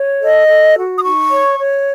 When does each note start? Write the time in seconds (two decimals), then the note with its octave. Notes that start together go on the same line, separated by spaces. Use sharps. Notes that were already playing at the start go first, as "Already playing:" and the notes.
Already playing: C#5
0.21 A4 D#5
0.49 A4
0.76 F#4
0.97 D#6
1.04 D#4 C#6
1.31 C#5
1.58 C#5